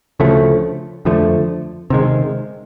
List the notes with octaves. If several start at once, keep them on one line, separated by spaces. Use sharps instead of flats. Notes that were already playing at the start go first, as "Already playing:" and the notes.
D2 C#3 F3 A3
F2 D3 F3 A3
C3 D#3 G#3